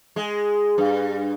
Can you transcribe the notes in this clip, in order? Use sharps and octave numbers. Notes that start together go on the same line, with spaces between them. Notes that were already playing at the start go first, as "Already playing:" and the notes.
G#3
G2